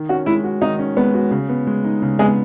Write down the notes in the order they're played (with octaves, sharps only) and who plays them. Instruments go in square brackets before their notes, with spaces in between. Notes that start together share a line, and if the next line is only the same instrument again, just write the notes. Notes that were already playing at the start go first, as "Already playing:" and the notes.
Already playing: [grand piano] D#3
[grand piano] C#4 [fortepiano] F#4
[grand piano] G#3 [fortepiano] E4
[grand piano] F#4
[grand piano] D#3 [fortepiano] D#4
[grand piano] C#4
[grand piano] G#3 [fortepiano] B3
[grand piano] F#4
C#3
B3
G#3
D#4
C#3
[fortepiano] G#3 [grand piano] B3